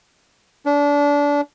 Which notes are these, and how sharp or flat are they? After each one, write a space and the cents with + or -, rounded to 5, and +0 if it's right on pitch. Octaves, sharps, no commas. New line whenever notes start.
D4 -25